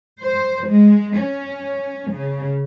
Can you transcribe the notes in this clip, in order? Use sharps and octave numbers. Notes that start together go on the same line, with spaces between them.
C5
G#3
C#4
C#3